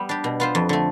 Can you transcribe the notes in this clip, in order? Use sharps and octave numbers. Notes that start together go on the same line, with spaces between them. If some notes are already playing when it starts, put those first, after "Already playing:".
Already playing: G3 B3
D4 G4
B2
B3 F4 C5
F2
D3 A3